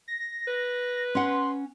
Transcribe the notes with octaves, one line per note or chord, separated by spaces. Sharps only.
A#6
B4
C#4 F#5 C6